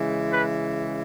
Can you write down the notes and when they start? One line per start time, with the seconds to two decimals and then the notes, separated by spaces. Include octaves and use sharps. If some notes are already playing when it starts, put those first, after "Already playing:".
Already playing: C#3 E3 G#3
0.31 B4